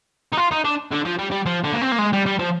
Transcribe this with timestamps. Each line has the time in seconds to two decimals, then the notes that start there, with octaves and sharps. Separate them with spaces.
0.33 D#4
0.37 F4
0.51 D#4
0.65 D4
0.92 D3
1.05 F3
1.19 G3
1.31 G3
1.46 F3
1.64 D3
1.73 A#3
1.81 C4
1.92 A#3
1.99 G#3
2.13 G3
2.26 G3
2.39 F3